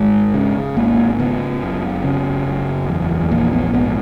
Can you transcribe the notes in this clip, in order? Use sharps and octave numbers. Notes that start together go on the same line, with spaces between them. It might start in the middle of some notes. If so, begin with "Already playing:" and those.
Already playing: G#1 G#3
C#3
G#1 A#3
C#3 B3
F#1
C#3
F#1
E2
A#1 A#3
B3
G#2 B3